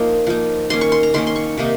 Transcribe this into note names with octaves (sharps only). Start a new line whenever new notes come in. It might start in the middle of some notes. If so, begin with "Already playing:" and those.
Already playing: F3 A#3 D#4 C6
F3 A#3 D#4
D#3 A#3 C#4 C6
C#6
C6
A#5
D#3 A#3 C#4 C6
C6
C#6
C3 D#3 A#3 D#4